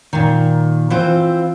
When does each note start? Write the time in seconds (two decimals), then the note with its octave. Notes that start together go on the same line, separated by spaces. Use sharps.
0.13 A#2 D#3
0.90 E3 C4 F4 C5